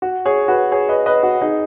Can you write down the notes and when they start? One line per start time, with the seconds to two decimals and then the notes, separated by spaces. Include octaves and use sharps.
0.02 F#4
0.25 G#4 C#5
0.48 F#4 B4
0.72 G#4 C#5
0.89 B4 D#5
1.06 B4 D#5
1.23 F#4
1.41 D#4 G#4